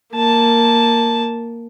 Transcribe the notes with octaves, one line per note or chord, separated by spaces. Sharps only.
A#3 A5